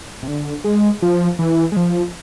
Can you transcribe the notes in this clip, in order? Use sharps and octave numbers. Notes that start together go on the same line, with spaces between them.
C3
D3
G#3
F3
E3
G#3
F3